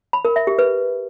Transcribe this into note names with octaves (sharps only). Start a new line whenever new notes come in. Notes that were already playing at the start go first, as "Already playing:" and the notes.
B5
A#4
E5
G4
B4